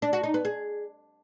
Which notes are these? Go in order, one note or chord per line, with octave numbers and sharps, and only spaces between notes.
D4
F#4
D#4
B3
G#4